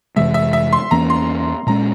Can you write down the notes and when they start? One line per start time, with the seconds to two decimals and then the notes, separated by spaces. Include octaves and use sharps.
0.16 F2 C3 E3 G#3 E5
0.34 E5
0.53 E5
0.73 C6
0.91 E2 E3 A#3 C#4 A#5
1.10 C6
1.67 A#2 G#3 C#4 A#5